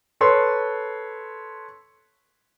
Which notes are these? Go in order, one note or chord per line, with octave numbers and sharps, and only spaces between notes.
A4 B4 C#5 C6